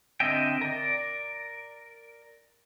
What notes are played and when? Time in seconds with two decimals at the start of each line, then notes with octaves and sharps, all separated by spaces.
0.20 D3 C4 D#5 E5 G5
0.61 A#4 D5